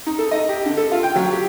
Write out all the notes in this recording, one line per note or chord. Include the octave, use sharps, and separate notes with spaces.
D#4
A4
D#5
G4
D3
A4
F4
G5
F#3
G4